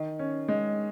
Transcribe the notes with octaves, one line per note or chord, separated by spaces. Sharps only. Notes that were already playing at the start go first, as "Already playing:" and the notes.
Already playing: D#3
C#4
G#3